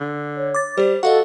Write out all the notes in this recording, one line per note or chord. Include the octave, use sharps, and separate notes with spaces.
D3
C#5
D6 A6
G3 G4 C5 D5
F#4 A4 D#5 F5 F#5